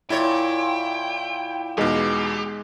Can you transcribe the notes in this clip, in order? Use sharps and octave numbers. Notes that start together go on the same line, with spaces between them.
A#2 E4 C#5 G5
E2 B2 G#3 D#4 G4